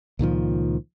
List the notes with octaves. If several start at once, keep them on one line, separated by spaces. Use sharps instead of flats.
C#2 A#2 D#3 F3